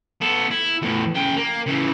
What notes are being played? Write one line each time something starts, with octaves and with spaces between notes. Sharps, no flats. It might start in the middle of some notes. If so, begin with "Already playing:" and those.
B3 A4
E4
E2 A2
C#3 G5
A#3
C#3 E3